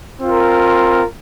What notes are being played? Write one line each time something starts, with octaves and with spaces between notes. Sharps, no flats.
C4 F4 A#4